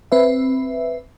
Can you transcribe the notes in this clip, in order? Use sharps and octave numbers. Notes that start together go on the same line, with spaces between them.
C4 B4 E5